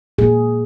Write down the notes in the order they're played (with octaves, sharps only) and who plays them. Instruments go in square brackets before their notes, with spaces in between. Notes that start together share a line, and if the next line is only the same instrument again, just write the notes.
[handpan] A#2 A#3 G#4